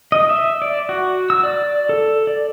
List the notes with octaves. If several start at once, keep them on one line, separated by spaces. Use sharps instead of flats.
D#5
E5
D5
F#4
E6
D5
A4
D5